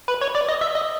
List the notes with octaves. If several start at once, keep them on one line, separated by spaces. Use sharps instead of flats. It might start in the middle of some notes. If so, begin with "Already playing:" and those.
B4
C#5
D5
D#5
E5
D#5